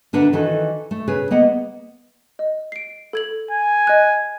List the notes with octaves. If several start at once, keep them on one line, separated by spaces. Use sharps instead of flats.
D3 D4 A#4 B4 E5 F#5
D#3 E3 F#4 A4
A3
C#3 G#4 B4
A#3 B3 D#5 F#5
D#5
C7 D7
A4 G#6 F#7
G#5
D#5 F#6